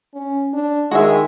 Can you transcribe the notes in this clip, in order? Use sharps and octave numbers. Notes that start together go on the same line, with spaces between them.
C#4
D4
D#3 G#3 F#4 E5